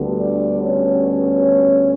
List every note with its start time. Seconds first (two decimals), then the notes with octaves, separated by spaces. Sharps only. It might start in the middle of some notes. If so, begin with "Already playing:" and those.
Already playing: D2 D3 G3 B3
0.20 D4 D5
0.62 C#4 C#5